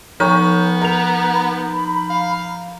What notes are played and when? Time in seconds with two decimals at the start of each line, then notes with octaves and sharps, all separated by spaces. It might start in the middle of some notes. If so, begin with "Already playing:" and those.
0.20 F3 B3 D#4 C#5 A#5 C#6 G6
0.81 A#4 A#5 F7
1.35 B5
2.10 F5